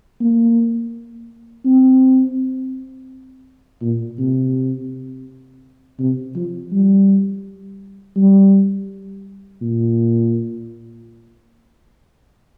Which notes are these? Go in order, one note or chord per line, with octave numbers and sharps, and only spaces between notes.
A#3
C4
A#2
C3
C3
F3
G3
G3
A#2